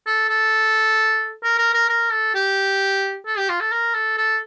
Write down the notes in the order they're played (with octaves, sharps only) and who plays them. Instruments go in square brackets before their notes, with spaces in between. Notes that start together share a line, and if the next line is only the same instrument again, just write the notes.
[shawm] A4
A4
A#4
A#4
A#4
A#4
A4
G4
A4
G4
F4
A4
A#4
A4
A4